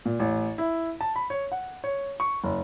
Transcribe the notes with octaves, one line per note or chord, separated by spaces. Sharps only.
A#2
A1
E4
A5
B5
C#5
F#5
C#5
C#6
F#1